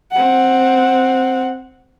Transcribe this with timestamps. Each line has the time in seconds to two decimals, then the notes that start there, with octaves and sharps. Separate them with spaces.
0.12 C4 F#5